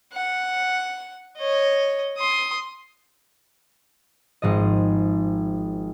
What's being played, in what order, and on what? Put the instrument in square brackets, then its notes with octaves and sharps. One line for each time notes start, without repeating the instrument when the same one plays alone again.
[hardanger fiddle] F#5
C#5 D#5
C6 D#6
[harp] G#1 G#2 F3 D#5